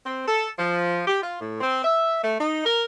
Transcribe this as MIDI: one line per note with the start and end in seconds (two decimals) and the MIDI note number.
0.06 0.25 60
0.27 0.48 69
0.59 1.01 53
1.07 1.18 67
1.22 1.39 65
1.40 1.58 45
1.61 1.83 60
1.84 2.21 76
2.24 2.37 57
2.40 2.64 63
2.65 2.84 70